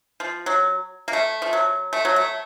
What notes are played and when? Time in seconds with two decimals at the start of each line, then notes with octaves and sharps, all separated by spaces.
0.20 F3
0.46 F#3
1.08 A#3
1.13 A3
1.42 F3
1.53 F#3
1.93 A3
2.05 F#3
2.16 A3